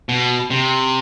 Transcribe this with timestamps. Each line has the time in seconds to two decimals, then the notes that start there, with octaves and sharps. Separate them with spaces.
0.09 B2
0.50 C3